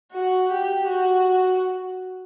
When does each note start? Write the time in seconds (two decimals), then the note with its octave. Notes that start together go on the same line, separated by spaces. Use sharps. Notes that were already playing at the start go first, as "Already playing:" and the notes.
0.13 F#4
0.51 G4
0.89 F#4